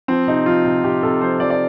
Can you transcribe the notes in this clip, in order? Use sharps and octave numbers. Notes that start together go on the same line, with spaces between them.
F3 C4
C3 D#4
F3 F4
C3
C3 G4
C3 A4
F3 C5
F3 D5
D5